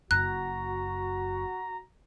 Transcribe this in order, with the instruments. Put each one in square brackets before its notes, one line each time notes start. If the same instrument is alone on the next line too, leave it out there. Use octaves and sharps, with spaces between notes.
[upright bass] F#1 F#2 [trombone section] F#4 [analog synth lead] A#5 [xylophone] F#6